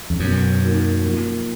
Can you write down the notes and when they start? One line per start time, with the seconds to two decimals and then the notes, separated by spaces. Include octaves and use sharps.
0.10 F2
0.19 F#2 B2 F#3 B3
0.61 A#3 D#4 F#4
1.04 F3 A#3 F4